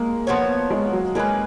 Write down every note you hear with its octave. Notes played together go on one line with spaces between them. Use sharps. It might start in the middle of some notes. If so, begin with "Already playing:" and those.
Already playing: G#3 A#3
F3 B3 F#4 C#5
G#3
F#3
G#3 A#3 C#4 G#4 B4